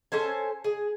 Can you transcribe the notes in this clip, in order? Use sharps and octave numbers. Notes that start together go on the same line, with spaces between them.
C#4 A4 C5 G#5
G#4